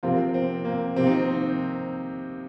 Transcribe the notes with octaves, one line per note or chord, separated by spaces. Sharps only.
C3 F3 A#3 C4 F4
C4
A#3
C3 F3 A#3 C4 F4
D#4
C4